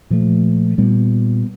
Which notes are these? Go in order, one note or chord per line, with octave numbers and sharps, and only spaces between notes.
A#2 F3 A3
A#2 G3 B3